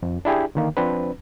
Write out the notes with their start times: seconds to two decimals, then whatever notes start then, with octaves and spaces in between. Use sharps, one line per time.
0.03 F2
0.25 D4 E4 G4 G#4
0.55 D3 D#3 A#3
0.77 F3 C4 D4 B4